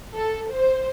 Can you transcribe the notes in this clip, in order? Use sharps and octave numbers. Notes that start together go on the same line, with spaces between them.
A4
C5